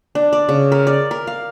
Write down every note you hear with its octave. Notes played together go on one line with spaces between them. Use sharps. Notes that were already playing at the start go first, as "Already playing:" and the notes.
D4
D5
C#3
A#4
D5
A#4
F5